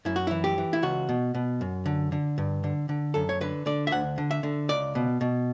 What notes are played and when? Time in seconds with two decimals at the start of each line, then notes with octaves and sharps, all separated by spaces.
0.05 F#2 E4
0.16 F#4
0.27 E3 E4
0.44 G4
0.58 E3
0.73 E4
0.82 C#2 F#4
1.09 B2
1.34 B2
1.61 F#2
1.86 D3
2.12 D3
2.38 G2
2.64 D3
2.89 D3
3.14 F#2 A4
3.29 C#5
3.41 D3 B4
3.66 D3 D5
3.87 E5
3.91 D2 F#5
4.18 D3
4.31 E5
4.43 D3
4.69 C#2 D5
4.95 B2
5.21 B2